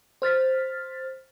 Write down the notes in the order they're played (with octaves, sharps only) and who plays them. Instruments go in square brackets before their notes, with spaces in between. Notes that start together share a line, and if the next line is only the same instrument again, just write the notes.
[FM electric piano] C5 F6 A6 B6